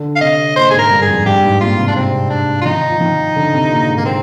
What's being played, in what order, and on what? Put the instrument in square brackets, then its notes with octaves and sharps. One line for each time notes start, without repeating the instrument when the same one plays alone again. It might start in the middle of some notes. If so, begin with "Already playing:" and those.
Already playing: [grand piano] D3
[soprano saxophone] F5
[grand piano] C3 [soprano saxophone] D#5
[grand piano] A#2 [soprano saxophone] C5
[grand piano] G#2 [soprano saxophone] G#4
[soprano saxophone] A#4
[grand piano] G2
[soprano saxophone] G#4
[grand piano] F2
[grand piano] G2 [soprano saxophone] G4
[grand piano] G#2
[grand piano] A#2 [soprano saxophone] F4
[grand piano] C3
[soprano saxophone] D4
[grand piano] C3 [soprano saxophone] C4
[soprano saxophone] D4
F4
[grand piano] D#3 [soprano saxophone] D#4
[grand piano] F3
D#3
D3
C3
A#2
G#2
[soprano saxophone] A#3
C4